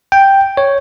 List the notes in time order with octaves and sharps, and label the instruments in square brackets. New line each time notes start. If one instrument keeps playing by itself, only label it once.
[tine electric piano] G5
C#5